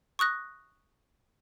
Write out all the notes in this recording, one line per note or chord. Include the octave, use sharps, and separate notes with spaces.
C#6 D#6 F#6 A#6